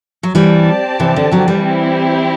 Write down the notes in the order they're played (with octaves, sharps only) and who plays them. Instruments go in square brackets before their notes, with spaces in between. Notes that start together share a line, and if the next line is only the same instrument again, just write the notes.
[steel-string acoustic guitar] F#3
[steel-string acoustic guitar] E3 G3 [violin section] C4 G4 D5 A5
[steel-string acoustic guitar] C3 E3
D3
D3 F#3
E3 G3
[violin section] C4 E4 G4